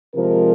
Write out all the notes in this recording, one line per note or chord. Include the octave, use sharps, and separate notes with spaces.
C3 F3 G#3 A#4